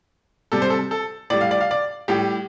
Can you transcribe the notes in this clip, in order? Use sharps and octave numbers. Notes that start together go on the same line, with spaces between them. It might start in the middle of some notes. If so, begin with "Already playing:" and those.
C3 G3 A4
C5
A4
A4
A2 G3 D5
F5
D5
F5
D5
A2 G3 G4